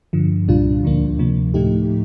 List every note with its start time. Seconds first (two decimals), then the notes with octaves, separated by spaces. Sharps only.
0.13 G2 D3 F3
0.48 C2 A#2 G3 D4 F4
0.84 D2 D3 F3 A#3 D4
1.19 D2 C3 F3 A#3
1.54 A2 F3 A3 D#4 G4